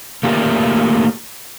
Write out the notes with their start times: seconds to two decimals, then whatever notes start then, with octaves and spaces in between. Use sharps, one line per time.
0.23 A3 A#3 F4 G4 A#4 E5